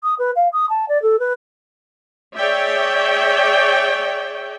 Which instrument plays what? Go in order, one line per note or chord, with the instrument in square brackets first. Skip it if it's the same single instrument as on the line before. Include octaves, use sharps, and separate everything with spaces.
[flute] D#6
B4
F5
D#6
A5
D5
A4
B4
[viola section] G#4 C#5 D5 E5 G5